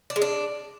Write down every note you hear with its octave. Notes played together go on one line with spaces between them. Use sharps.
D4
G#3
D4